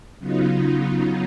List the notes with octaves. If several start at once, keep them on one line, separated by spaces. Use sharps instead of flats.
C#3 F#3 B3 D#4 F4